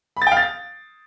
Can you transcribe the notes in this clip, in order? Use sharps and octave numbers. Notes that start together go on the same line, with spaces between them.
B5
A6
G5
F5
A6